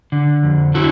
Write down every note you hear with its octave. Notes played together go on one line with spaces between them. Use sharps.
D3
F2
D3 E4 F#4